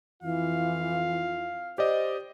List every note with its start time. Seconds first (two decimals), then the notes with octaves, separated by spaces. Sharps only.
0.23 F2 E3 E4 F4 F5
1.78 G4 C5 D5 D#5